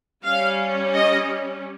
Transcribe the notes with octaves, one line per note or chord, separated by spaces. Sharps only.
G3 C#4 F5
D#5